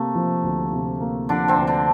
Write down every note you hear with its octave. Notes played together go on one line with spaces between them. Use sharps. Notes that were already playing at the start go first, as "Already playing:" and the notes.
Already playing: C3 A3 A#3
F3
D2
C3
A#3
D3 F3 D4
C3 C4
D2
D3 D4